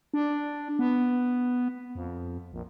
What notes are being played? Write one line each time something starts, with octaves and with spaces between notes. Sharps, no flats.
D4
B3
F2
A#1